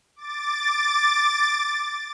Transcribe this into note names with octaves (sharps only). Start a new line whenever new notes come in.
D6 A6